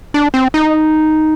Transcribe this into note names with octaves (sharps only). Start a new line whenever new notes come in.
D4
C4
D#4